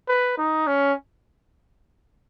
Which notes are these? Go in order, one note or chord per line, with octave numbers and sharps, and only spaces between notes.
B4
D#4
C#4